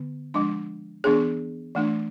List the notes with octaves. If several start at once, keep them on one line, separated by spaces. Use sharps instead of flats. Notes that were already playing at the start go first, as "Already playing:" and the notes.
Already playing: D3 B3
F3 G#3 D4
E3 B3 D4 G#4
E3 A3 D4